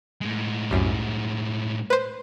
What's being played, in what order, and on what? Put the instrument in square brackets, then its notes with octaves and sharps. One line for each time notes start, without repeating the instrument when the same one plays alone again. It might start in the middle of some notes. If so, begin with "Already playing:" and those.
[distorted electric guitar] A2 G#3
[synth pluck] C2 F#2
B4 C5